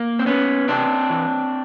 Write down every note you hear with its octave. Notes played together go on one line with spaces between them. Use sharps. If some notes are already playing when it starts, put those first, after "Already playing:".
Already playing: A#3
C4
B3 C#4
C3 C4 D4
E3